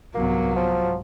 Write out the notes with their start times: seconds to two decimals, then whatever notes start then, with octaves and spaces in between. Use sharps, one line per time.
0.15 C2 G#2 F#3 A#3 B3
0.56 G#2 F3